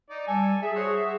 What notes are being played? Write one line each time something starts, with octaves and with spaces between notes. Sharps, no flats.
D#4 D5
G3 A4 G#5
G#4 E5
F#4 G#4 C5 C#5
E5